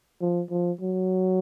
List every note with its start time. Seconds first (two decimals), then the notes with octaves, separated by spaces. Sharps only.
0.21 F3
0.51 F3
0.81 F#3